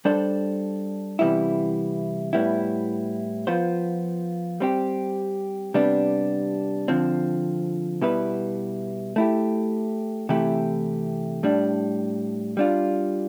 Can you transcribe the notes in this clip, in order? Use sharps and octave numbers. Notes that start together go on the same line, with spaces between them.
G3 D4 A4 C5
C3 E3 G3 B3 E4
A2 G3 B3 E4
F3 B3 F4 C5
G3 C4 G4
C3 G3 B3 D4
D3 F3 C4
B2 G3 B3 E4 B4
A3 E4 G4
C3 E3 A3 E4 G4
A2 G3 D4
G3 D4 F4